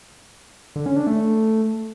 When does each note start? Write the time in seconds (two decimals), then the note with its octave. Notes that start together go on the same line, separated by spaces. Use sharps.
0.76 D3
0.86 C#4
0.96 D4
1.07 A3